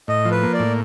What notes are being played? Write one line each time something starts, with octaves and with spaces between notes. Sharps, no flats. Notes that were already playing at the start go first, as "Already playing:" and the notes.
A2 D#5
F3
B4
A#3
D5
A2